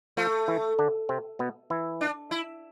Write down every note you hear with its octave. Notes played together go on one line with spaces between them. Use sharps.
F3 A3 F4
E3 E4
D3 D4
C3 C4
B2 B3
E3 E4
D4
E4